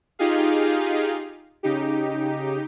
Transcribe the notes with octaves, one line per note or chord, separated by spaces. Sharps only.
D#4 F4 G4 G#4 F5
C#3 D#4 G4